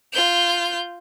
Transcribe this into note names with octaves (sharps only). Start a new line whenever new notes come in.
F4 G6